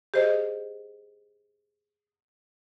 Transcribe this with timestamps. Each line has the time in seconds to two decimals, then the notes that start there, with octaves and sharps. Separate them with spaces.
0.14 G4 G#4 C5 D#5